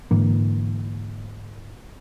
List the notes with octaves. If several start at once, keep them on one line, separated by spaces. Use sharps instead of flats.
G#2 D3 E3 A#3